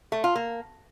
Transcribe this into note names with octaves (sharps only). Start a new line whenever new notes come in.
A3
F4
A#3